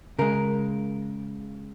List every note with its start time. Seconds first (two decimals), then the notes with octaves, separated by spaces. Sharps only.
0.19 C#3 G#3 A#4